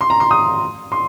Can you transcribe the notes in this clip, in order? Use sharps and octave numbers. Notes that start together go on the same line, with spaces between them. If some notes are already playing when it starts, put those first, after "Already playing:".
C6
A#5
C6
D#6
C6